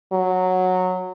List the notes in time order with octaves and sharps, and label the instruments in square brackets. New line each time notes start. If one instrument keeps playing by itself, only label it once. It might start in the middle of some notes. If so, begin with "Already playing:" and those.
[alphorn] F#3